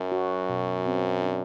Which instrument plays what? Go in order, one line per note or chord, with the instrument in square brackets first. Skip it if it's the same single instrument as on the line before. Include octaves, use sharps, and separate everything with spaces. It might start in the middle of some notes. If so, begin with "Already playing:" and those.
Already playing: [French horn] F#2 [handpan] F#3
[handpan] F#4
B2
C4
D4